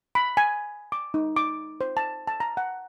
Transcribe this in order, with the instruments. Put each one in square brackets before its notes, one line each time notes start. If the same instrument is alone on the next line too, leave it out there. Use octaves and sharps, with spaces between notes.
[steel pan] B5
G#5
D6
D#4
D6
C5
A5
A5
A#5
F#5